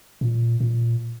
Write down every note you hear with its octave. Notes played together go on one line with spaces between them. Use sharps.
A#2
A#2